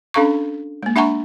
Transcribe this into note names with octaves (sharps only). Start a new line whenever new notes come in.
C#4 D4 A4 F5 A#5 C#6
G#3 A#3
D4 E5 F#5 G#5 A#5 C#6